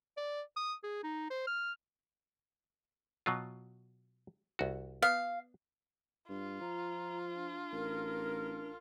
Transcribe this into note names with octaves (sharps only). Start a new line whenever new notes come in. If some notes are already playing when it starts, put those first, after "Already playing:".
D5
D#6
G#4
D#4
C5
F6
B2 F#3 F4
C2 F#4
B3 F5
G2 F4
F3 A#5
D4
A1 A#4